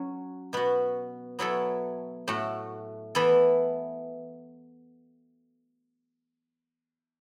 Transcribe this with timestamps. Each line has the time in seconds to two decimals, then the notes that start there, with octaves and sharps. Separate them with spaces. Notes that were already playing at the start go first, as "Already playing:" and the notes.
Already playing: F#3 C#4 F#4
0.53 B2 B3 F#4
1.39 F#3 B3 E4 A4 C#5
2.28 A2 A3 F#4
3.15 E3 B3 E4 A4